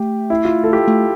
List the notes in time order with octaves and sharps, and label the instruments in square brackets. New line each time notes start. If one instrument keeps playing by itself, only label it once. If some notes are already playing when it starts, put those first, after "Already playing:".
Already playing: [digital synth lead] A3 [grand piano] G4
[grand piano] E4
F4
A4
G4
[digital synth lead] A3